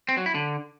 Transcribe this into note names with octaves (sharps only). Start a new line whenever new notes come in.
C4
F#3
E4
D3